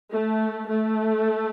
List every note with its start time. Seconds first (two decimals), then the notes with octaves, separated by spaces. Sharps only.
0.12 A3
0.70 A3